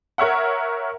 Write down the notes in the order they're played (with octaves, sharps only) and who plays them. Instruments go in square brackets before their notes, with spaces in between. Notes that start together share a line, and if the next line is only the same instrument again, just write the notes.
[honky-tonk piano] A#4 C#5 E5 F#5